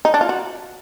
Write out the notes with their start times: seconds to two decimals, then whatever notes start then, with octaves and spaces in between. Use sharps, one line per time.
0.05 D#4
0.14 D4
0.21 F4
0.29 F#4